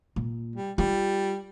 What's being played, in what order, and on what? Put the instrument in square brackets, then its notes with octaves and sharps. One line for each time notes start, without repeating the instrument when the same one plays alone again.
[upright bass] A#2
[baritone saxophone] G3
[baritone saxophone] G3 [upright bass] F4